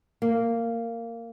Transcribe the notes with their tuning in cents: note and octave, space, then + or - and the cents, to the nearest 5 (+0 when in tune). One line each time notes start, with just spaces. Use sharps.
A#3 -15